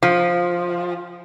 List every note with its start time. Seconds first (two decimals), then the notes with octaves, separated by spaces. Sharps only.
0.03 F3